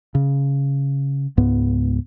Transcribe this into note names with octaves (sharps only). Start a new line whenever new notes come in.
C#3
C#2 G#2 B3